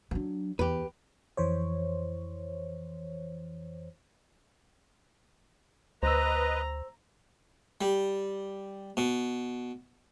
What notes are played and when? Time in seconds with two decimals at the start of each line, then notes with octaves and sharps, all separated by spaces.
0.11 F#3 D4
0.59 E2 G4 B4
1.37 F2 E3 C5 C#5
6.03 D2 B4 C5 D#5 A#5 E6
7.81 G3
8.97 B2